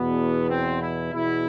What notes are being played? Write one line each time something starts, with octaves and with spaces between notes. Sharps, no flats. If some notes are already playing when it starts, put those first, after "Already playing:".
Already playing: E2 B2 B3
C4
E4
E2 B2 E4